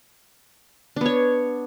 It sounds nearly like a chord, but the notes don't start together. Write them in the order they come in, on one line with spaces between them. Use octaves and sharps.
D4 B3 C#5